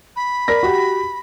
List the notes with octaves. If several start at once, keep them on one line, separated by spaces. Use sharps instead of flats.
B5
A#4 D5 A#6
F#4 G4